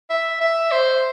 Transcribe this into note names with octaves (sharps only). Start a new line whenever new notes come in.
E5
E5
C5